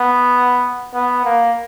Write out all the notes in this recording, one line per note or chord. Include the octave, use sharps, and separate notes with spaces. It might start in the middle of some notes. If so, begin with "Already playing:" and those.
Already playing: B3
B3
A#3